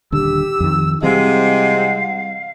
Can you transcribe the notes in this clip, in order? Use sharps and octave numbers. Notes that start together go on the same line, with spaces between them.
D#1 D3 G4 E6
F2 D#3
C3 E3 G3 G#3 C4 F5 F#5